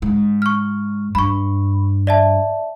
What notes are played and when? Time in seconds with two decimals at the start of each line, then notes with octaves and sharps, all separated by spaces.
0.02 G#2
0.42 C#6 F6
1.15 G2 B5 C#6
2.07 D5 E5 A5